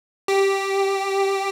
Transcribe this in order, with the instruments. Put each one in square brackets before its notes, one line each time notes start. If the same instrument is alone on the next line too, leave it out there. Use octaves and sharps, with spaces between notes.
[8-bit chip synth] G4